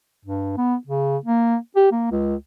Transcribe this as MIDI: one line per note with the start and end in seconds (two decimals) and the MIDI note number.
0.25 0.53 43
0.57 0.75 59
0.87 1.17 49
1.25 1.56 58
1.76 1.91 67
1.92 2.09 58
2.11 2.35 37